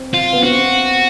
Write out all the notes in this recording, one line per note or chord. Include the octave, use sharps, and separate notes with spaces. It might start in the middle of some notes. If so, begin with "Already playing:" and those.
Already playing: C4
F4
B3
C4 F#4